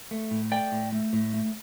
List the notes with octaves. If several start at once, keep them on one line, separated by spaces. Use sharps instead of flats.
A3
A2
A3 D5 G5
A2
A3
A2
A3